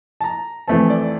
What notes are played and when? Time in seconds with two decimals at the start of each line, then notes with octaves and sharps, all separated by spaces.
0.21 A5
0.24 A#5
0.68 F2 E3 A3 C4 A5
0.90 D5